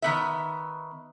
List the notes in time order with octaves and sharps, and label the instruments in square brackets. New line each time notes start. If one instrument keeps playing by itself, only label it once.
[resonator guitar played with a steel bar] D#3 B3 E5